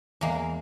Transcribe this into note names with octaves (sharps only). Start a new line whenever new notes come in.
E2 G#3 A#3